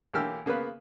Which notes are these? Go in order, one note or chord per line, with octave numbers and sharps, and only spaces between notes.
B1 E3 A#3 G4 E6 F6
C#3 A#3 B3 B4